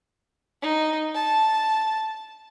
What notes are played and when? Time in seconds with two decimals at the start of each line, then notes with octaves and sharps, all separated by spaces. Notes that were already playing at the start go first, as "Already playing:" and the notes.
0.62 D#4
1.15 A5